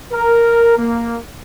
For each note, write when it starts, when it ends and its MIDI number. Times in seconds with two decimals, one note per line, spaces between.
0.12 0.74 70
0.77 1.17 58